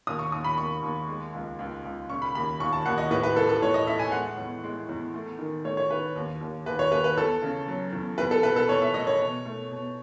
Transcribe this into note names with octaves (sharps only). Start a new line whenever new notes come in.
D#2 D#6
C#6
D#2 D#6
B5
D#2 C#6
D#2
G#3
C#2
C#2
C#2
C#3 C#6
B5
D#2 B5
D#2 C#6
A5
D#2 F#5
D#5
A2 B4
B4
E3 A4
A4
A2 C#5
D#5
A3 E5
G#5
G#3 F#5
E2
G#3
E2
A3
D#3
A3 C#5
C#5
D#3 B4
D#2
D#2
D#2 B4
C#5
D#2 B4
B4
E2 A4
C#3
F#3
E2
E2 B4
A4
B2 B4
A4
E2 C#5
E5
A3 D#5
C#5
B2
A3
B2